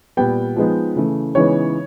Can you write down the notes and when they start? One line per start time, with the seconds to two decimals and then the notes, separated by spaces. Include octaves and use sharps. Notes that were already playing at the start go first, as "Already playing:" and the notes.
0.17 A#2 G3 B3 G5
0.56 F3 G#3 B3 D#4
0.96 C#3 E3 A3
1.35 C#3 E3 G#3 B3 D#4 C#5